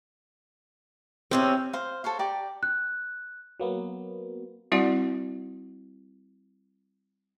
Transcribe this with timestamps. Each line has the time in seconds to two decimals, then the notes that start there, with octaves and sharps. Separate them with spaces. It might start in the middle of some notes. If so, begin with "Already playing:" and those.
1.31 E2 C3 C4 C#4
1.73 C5 F5
2.04 A4 C5 C#5 F5
2.19 G4 D5 G5 A#5
2.63 F#6
3.60 F#3 A#3 B3
4.72 G3 C4 E4 F#4 D5 F#5